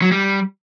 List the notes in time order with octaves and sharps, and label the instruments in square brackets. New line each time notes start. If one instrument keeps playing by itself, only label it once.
[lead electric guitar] F#3
G3